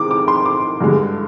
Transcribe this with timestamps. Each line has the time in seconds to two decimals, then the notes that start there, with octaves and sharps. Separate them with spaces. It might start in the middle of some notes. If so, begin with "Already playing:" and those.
Already playing: C3 D#3 G#3 D6
0.11 D6
0.28 C6
0.45 D6
0.81 G2 D3 G#3